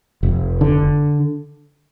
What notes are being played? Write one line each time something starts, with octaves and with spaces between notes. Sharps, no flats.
F1
D3